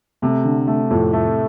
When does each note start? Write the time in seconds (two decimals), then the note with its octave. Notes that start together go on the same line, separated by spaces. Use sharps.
0.22 C3 A3
0.44 D3
0.67 A3
0.90 F2 A2
1.13 A3